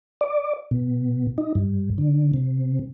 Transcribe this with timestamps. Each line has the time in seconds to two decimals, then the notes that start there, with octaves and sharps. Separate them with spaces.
0.21 D5
0.71 B2
1.38 D#4
1.55 G2
1.98 D3
2.34 C3